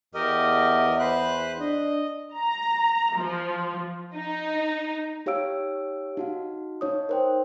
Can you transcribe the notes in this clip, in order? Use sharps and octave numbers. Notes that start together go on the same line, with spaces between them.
E2 G4 A#4 D#5
B4 C5 F#6
D4 D#5
A#5
F3
D#4
D#4 G4 C#5 F5 E6 D7
D#4 F#4 F5
D#4 C#5 D#6
A#4 C5 G5